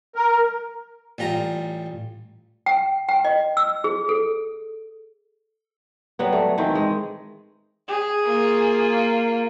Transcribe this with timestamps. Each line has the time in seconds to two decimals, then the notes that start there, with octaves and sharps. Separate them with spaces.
0.15 A#4
1.18 A1 G3 F4 A#5
2.66 G5
3.09 G5
3.25 D#5
3.57 E6
3.84 G#4
4.09 A4
6.19 F#3 G3 B3
6.32 A3
6.58 D#3 E3 C4
6.75 G#3
7.88 G#4
8.25 A#3 F4